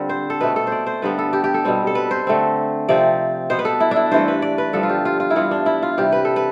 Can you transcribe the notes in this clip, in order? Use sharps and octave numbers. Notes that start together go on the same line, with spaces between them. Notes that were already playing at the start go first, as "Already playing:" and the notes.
Already playing: D3 G3 C4 F4
C5
A4
B2 A3 C4 B4
A4
C5
D5
C5
G2 D3 G3 B3 B4
A4
G4
G4
A4
B2 G3 C4
A4
B4
C5
D3 A3 C4
C3 F3 C4 D5
B2 B3 C5
B4
A4
E4
D4 E4
G2 E3 A3 C5
B4
D5
B4
G2 D3 F3 B3 A4
F4
G4
F4
F4
E4
G2 E3 B3 F4
D4
E4
F4
C3 E3 G3 G4
B4
A4
B4